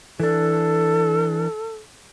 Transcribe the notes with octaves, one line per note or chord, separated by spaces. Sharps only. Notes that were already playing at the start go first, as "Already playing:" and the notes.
E3 D4 A4